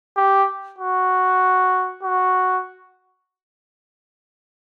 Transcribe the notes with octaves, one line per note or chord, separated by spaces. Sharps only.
G4
F#4
F#4